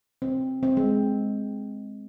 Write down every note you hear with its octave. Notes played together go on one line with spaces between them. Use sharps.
C4
C4
G#3